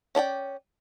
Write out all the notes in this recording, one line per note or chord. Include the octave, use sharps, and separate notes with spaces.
C#4 D4 D5 G5